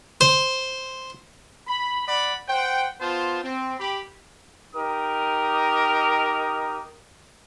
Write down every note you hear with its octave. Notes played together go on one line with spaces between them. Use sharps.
C5
B5
D5 F#5 B5
C5 F#5 G5
B3 F4 C5 A5
C4
G4 B5
D#4 G4 A#4 D#6